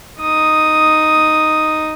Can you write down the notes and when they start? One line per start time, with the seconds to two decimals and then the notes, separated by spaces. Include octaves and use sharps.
0.21 D#4 D#6